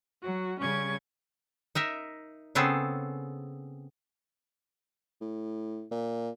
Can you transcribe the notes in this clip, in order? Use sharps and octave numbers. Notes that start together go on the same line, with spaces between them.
F#3 F#4
C#3 G3 C#4 C#6 G#6
D#4 A#4 E5
C#3 B3 C4 G#4 A4
A2
A#2